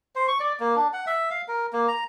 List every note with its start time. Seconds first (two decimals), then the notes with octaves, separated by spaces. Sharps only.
0.15 C5
0.28 C#6
0.40 D5
0.60 A#3
0.76 D4
0.93 F#5
1.07 E5
1.31 F5
1.48 A#4
1.73 A#3
1.88 A#5